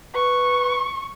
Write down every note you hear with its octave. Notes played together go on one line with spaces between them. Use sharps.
B4 C#6